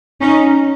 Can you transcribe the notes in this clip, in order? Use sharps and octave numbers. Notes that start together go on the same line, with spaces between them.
C#4 D#4